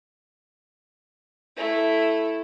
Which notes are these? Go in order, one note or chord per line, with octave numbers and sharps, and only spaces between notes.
A3 E4